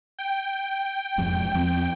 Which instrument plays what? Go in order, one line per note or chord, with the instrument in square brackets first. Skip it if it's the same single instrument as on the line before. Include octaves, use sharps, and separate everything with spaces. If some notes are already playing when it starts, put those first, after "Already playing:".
[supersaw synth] G5
[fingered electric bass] E1 F2 G#2
E2 F3 C4